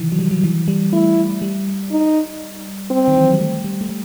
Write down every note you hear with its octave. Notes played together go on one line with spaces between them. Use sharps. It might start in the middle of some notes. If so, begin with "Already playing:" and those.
Already playing: C3 D#3 E3
F#3
G3
F#3
E3
G3
A3 E4
G3
D#4
C4
D#3
E3
F#3
G3
A3
G3
A3
G3